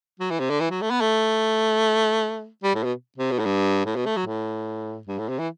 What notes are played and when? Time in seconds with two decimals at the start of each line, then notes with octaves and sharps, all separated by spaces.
0.20 F#3
0.31 E3
0.40 C3
0.50 D3
0.61 E3
0.70 F#3
0.82 A3
0.91 B3
1.01 A3
2.63 G3
2.75 A2
2.84 B2
3.18 C3
3.31 B2
3.39 A2
3.45 G2
3.86 A2
3.96 B2
4.06 A3
4.17 F#3
4.26 A2
5.07 G2
5.19 A2
5.29 C3
5.39 E3